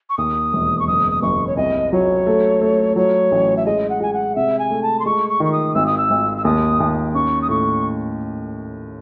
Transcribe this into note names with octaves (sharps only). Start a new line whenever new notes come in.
C#6
D#2 D#6
E1
C#6
F#1 D#6
D#6
F#1 C#6
C#5
C2 D#5
F#3 C#5
A3
A3
F#3 C#5
A1
E5
G#3 D#5
F#5
G#3 G#5
F#5
C3 E5
G#5
A3
A5
C6
G#3 C#6
C#6
D#3 C#6
D#6
G#1 E6
D#6
E6
G#1
E6
D#2 D#6
D#2
C#4 C#6
D#6
A2 C#6